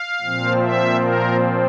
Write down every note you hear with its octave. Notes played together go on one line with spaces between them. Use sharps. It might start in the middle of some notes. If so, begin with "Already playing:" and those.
Already playing: F5
A#2 F3 C4
E5
A#4